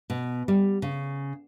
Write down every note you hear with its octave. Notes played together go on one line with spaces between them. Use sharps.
B2
G3
C#3